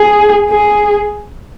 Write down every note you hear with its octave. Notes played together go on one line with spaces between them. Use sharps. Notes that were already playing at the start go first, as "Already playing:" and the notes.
Already playing: G#4
G#4